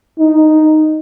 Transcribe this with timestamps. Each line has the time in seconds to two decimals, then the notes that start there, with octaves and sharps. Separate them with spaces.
0.19 D#4